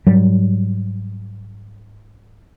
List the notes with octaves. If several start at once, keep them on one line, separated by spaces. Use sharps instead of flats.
G#2 F#3 G3